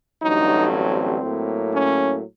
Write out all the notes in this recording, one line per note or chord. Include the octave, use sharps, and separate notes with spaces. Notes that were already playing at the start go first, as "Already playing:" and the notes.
A1 G2 D3 F#3 D#4
C4
A2 F#3 A#3
C#4